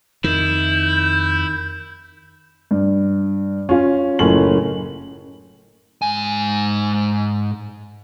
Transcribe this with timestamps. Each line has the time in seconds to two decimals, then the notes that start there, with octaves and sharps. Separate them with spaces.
0.24 F2 D#3 E4 G6
2.71 G2
3.69 C#4 F4
4.19 F#1 A2 C#4 F#7
6.02 G#2 G#5